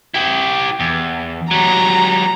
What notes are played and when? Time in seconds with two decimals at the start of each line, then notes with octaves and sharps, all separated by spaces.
0.14 E4 G4
0.80 E2
1.51 F#3 G3 A#5